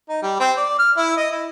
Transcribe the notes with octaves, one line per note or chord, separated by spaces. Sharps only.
D#4
G3
C4
D5
F6
E4
D#5
E4